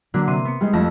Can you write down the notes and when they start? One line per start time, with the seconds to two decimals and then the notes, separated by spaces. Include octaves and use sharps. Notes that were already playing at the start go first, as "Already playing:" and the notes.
0.14 D3 F#3 A#3 D4
0.27 C3 C6 D#7
0.45 B3 C#7
0.61 G3 G#3 D#4
0.73 F2 A3 E6 A#6